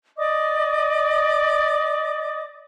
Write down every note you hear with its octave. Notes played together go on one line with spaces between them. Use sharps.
D5 D#5 D6 D#6